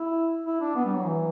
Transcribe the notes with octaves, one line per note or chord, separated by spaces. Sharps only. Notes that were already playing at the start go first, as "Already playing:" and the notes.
Already playing: E4
E4
D4
B3
G3
F#3
E3